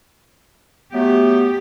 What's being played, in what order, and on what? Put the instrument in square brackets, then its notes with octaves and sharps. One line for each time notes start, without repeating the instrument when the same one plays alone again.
[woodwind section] F#3 A3 B3 [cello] G4